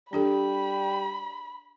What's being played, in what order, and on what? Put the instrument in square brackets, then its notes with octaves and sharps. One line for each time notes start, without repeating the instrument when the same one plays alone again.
[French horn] G3 [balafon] D4 G4 A4 [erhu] B5